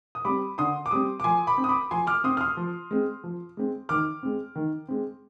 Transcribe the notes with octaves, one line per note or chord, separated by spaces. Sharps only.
D#6
G3 C4 B5 D6
D3 C6 D#6
D6
G3 C4 C6 D#6
D6
F3 G#5 C6
B5 D6
C4
D#6
B5 D6
F3 G#5 C6
D6 F6
C4 C6 D#6
F6
C6 D#6
F3
G#3 C4
F3
G#3 C4
D#3 D6 F6
G#3 C4
D#3
G#3 C4